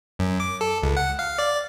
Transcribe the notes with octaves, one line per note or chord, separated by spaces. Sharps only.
F#2
D6
A4
C#2
F#5
F5
D5